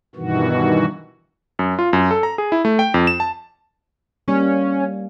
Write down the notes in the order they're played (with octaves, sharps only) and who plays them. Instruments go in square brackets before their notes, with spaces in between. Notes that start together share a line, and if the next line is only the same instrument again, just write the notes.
[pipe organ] G2 B2 D#3 E3 F#4
[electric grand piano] F#2
F4
F#2
A4
A#5
G#4
E4
A3
G5
F2
E7
A5
[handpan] G3 A#3 [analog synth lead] C#4